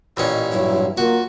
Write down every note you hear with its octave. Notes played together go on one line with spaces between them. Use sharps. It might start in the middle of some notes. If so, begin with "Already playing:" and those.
A1 A#2 C#4 D#5
G2 F#3 E4
A#3 F4 F#4